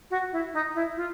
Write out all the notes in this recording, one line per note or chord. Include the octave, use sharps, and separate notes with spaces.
F#4
E4
D#4
E4
F4